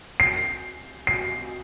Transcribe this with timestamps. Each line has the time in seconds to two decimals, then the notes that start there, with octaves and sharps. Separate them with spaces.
0.20 C7
1.07 C7